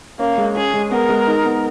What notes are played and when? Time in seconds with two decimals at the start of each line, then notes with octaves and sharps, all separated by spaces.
0.19 A#3 C#4
0.38 G#3
0.56 C#4 G#4
0.74 G#3
0.91 B3 A#4
1.09 G#3
1.27 D#4
1.45 B3